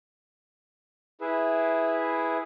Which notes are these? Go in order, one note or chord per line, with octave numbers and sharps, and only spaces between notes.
E4 G#4 B4 E5